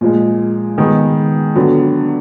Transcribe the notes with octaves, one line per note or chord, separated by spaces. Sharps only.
A#2 F3 G#3
D#3 G#3 B3
D3 F#3 B3